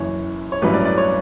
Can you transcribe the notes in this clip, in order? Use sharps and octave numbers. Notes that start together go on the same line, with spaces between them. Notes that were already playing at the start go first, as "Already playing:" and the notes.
Already playing: F#1 F#2 E3 C#5
C#5
A1 G2 F#3 C#4 E4 B4
D5
D5
C#5